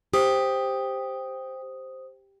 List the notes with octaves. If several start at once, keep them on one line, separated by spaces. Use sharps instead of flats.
G4 C5 D#6